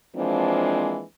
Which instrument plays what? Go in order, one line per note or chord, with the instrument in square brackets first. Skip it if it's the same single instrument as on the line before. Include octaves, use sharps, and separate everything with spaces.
[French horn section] E3 F3 G#3 A#3 C4 D4